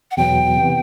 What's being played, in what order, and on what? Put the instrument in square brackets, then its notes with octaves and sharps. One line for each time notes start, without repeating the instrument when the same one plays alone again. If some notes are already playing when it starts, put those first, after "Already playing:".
[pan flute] F#5
[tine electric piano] E2 B2 F#3 B3 [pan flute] G5
[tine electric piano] C3 E3 B3